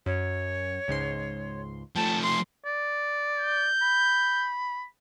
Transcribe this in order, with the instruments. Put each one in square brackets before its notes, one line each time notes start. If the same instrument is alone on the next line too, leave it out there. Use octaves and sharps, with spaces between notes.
[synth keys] F#2 [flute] C#5
[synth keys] C#2 G#2 C6
[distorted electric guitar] F3 A3 [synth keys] G5 [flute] A5
[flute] C6
[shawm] D5
[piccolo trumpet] G6
[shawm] B5